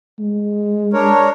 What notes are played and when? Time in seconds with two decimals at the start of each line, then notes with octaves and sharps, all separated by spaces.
0.20 G#3
0.93 D4 A#4 C#5